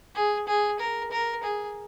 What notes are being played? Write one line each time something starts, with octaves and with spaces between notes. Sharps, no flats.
G#4
G#4
A#4
A#4
G#4